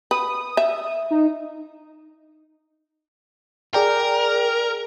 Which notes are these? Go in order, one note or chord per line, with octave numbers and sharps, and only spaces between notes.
B4 D#6
E5
D#4
G#4 A#4 D5 G5